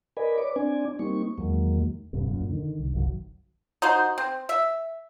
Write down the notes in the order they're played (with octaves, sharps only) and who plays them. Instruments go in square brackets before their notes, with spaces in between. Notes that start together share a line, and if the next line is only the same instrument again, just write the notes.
[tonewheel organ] A#4 B4 D5 D#5 G#5 B5
B4 C#5 D5 D6
C4 D4 D5 G#5
G3 A#3 C4 D#4 C#6
E2 D#3 F#3 G#3 A#3
[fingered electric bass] D1 B1 G2 C3
F#2 A#2
D3 D#3
C2
G1 C2 D#3 F#3
[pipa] D#4 F#4 C5
C4
E5